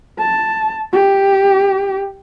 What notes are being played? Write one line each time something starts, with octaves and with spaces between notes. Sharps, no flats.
A5
G4